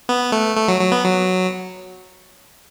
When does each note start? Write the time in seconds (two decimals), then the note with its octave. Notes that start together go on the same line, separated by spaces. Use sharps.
0.09 B3
0.32 A3
0.57 A3
0.68 F#3
0.80 F#3
0.92 B3
1.04 F#3